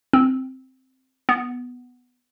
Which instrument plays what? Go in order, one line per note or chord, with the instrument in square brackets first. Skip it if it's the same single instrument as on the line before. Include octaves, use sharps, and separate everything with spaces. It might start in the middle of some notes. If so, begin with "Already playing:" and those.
[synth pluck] C4
B3